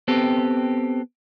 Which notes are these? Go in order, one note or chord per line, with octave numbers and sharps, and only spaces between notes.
B3 C4 G4 A4